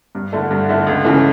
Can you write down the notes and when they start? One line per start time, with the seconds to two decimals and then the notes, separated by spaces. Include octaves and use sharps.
0.15 G2
0.33 D3 A3 E4
0.51 G2
0.69 D3 A3 E4
0.87 C#2
1.05 C#3 E3 A3